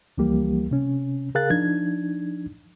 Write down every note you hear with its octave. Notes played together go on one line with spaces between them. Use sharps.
C#2 E3 F3 G3 A#3 G4
C3 C#4
C#3 G#4 A#4 F5 F#6 A6
F3 D4 D#4 G#6